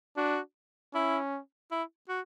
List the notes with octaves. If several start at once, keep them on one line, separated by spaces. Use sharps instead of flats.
D4 F#4
C#4 E4
E4
F#4